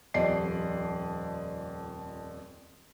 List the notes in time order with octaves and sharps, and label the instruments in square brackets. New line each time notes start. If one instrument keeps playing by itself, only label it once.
[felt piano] D#1 F2 D5 D#5 C7